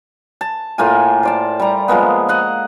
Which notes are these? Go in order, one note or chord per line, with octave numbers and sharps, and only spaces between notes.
A5
A2 A#3 F4 G#5
C5 D5 A5
G3 A#5
F3 G#3 A#3 B3
D#5 F#5 A#5